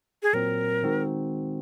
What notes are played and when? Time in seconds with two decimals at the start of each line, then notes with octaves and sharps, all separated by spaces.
0.23 G#4
0.33 A#2 F#3 C4 A#4
0.83 D#3 G#3 C4 D#4 F#4